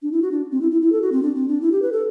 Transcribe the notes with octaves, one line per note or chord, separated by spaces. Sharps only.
D4
E4
F#4
D4
C4
E4
E4
E4
A4
F#4
C4
D4
C4
D4
E4
G4
B4
A4